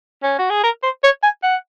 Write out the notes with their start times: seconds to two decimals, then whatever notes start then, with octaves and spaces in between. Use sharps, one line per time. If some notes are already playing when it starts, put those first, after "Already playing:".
0.23 C#4
0.39 F#4
0.50 G#4
0.63 A#4
0.83 C5
1.03 C#5
1.23 G#5
1.43 F#5